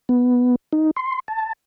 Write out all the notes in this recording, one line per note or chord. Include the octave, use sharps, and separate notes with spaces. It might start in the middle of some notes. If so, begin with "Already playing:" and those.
B3
D#4
C6
A5